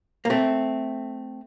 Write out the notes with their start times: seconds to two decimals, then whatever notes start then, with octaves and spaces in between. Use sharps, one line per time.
0.25 A#3
0.30 A3 C4